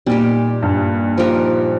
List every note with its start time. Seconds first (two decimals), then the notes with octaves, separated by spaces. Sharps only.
0.06 A#2 G3 D#4 G4
0.63 G2
1.18 F3 D#4 G4 A#4